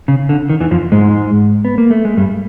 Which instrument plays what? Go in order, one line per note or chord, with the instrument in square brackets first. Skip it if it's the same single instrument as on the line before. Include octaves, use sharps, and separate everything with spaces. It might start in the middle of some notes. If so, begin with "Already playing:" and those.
[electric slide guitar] C#3
D3
D#3
E2 E3
F2 F3
G#2 G#3
B3
A#3
A3
G#3
G2 G3